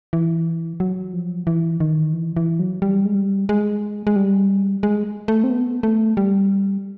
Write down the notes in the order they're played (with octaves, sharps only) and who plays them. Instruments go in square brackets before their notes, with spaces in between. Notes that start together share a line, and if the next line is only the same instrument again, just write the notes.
[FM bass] E3
F#3
F3
E3
D#3
E3
E3
F#3
G3
G#3
G3
G#3
G#3
G3
G#3
A3
C4
B3
A3
G3